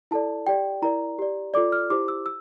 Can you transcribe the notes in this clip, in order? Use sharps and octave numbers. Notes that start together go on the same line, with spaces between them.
E4 A4 D5 A5
G4 D5 G5
E4 A#4 D5 A#5
G4 D5
F4 A4 D5 D6
F6
E4 G4 C5 D6
E6
E6